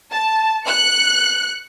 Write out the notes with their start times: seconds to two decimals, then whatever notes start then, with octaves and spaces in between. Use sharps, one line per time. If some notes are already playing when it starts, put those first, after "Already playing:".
0.12 A5
0.65 F#6 C#7